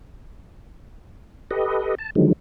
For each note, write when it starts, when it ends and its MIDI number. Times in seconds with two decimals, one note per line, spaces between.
1.51 1.95 67
1.51 1.95 69
1.51 1.95 71
1.51 1.95 75
1.99 2.10 81
2.15 2.33 50
2.15 2.33 51
2.15 2.33 53
2.15 2.33 54
2.15 2.33 56